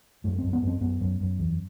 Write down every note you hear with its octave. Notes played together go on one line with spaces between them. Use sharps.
F#2 A3
F#2 C4
B3
F#2
C4
F#2 B3
F#2
F#2
E2